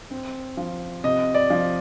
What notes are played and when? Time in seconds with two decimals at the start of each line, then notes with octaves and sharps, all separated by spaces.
0.11 C4
0.57 F3
1.04 C3 D#5
1.35 D5
1.50 F3